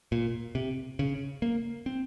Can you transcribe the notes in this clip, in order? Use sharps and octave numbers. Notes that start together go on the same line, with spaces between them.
A#2
C3
C#3
A#3
C4